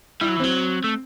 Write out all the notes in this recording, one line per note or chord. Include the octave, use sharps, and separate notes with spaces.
G3 E4
F#3
E3
F#3 C4
A3